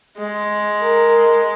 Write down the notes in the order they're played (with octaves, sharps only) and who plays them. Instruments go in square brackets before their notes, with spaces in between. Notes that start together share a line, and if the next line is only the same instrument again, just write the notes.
[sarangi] G#3
[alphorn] A#4